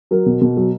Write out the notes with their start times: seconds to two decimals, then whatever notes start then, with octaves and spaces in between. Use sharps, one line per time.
0.11 F#3 A#4
0.26 B2
0.41 B2
0.57 F#3